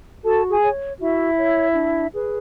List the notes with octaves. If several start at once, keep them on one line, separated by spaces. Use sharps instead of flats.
F#4 A4 A5
G#4 G#5
C#5
E4 F#4 E5
C#5
D4
G#4 B4